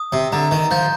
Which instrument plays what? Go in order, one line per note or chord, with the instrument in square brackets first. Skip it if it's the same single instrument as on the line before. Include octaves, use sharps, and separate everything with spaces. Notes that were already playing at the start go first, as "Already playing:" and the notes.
Already playing: [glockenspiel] D#6
[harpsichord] C3
[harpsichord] D3 [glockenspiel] A#5
[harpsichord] D#3
[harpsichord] F3 [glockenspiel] G6